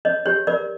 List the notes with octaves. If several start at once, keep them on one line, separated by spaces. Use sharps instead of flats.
C#5 D#5
G4 C#5
A#4 D5